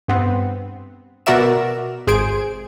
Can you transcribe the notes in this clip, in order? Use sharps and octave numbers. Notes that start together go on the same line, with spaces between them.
G2 B3 C4
B2 F#4 A#4 D5 E5 E7
G#1 G#4 C5 G#6 D7